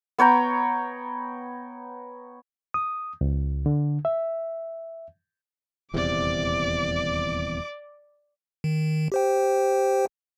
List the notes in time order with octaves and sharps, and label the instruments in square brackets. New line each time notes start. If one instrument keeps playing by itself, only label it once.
[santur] B3 C#5 G5 A#5
[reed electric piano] D#6
C#2
D3
E5
[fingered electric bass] D#1 E2 C3 [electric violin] D5 D6
[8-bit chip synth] D#3
G4 C5 G5